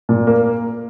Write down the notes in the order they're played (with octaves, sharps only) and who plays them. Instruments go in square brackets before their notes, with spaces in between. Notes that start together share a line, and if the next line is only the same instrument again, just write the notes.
[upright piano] A#2
A#3